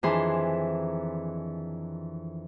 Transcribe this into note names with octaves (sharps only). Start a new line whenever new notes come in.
F2 D#3 E3 D4 G#4 C6